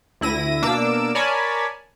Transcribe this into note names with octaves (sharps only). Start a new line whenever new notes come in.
D2 E4 A#6 D#7
B2 A#3 D4 D6 E6
A#4 C#5 D5 G#5 A5 B5